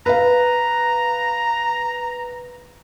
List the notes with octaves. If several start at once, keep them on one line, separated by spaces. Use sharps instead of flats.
B4 F5 A#5